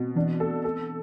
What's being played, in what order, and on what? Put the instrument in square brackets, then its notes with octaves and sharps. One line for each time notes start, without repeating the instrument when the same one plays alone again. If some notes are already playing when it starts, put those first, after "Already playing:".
Already playing: [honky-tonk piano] B2 [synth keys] B3 C4
[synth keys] E3 [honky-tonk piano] D4
[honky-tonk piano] A4
A4